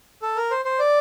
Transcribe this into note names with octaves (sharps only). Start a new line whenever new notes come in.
A4
A#4
C5
C5
D5